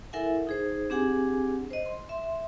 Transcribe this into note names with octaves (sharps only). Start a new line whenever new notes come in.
E4 A4 A#4 E5 F#5 G#5
D#4 G#4 C5
C4 D4 G4 G#4 F#5 G#5
C5 D#5
C6
E5 C6